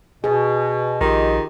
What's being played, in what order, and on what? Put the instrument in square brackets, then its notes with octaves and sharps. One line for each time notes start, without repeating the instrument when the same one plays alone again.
[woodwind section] B2 [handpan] G#4
[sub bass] A#1 [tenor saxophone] D#3 [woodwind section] D#4 F4 G4